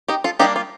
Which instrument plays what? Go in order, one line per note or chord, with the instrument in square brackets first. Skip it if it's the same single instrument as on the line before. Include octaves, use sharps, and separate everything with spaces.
[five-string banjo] D#4 G4
F4 A4
G3 A#3 D4 D#4 G4
F4